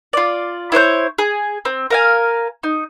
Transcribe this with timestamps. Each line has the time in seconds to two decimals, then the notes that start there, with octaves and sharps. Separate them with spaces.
0.13 F4 D5
0.72 E4 C5 C#5 G6
1.18 G#4
1.65 C4
1.90 A#4 F5 G#5
2.63 D#4